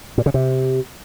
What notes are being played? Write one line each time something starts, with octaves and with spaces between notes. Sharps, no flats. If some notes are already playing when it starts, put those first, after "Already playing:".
A#2
C#3
C3